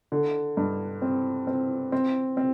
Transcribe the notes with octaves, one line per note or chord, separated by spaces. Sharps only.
D3
G2
C4
C4
C4
C4